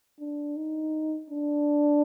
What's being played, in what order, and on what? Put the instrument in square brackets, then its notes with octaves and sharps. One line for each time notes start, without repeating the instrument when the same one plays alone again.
[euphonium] D4
D#4
D4